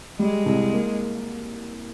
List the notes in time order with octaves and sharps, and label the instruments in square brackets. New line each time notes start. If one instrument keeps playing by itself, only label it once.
[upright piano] G3 [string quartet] G#3
[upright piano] C2
A#3